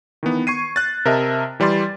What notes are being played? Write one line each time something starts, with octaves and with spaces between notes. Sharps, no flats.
D#3 E3 B3
C#6 G#6 C7 D#7
F#6 A6
C3 A#4 D#5 E5 A5
E3 G3 D5 C6 A6